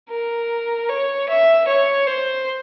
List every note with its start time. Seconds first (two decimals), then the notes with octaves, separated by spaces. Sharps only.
0.10 A#4
0.89 C#5
1.29 E5
1.67 C#5
2.07 C5